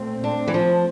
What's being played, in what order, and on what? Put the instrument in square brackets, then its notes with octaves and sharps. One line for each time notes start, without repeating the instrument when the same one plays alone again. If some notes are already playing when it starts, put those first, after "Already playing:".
Already playing: [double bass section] A#2 A3 C4
[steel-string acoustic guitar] D4
E3
F3